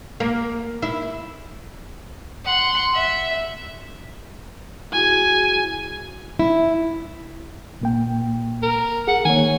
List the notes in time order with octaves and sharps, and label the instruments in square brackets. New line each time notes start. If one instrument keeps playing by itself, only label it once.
[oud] A#3
E4
[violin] F#5 C6
E5
[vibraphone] E4 F#4 G#4 [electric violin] G#5
[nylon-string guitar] E4
[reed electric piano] A#2 A#3 G5
[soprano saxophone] A#4
[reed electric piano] G#4 [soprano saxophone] F#5
[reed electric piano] D#3 A#3 C#5 [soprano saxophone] G#5